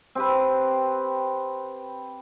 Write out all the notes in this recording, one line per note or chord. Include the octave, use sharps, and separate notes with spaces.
C4 G4 B4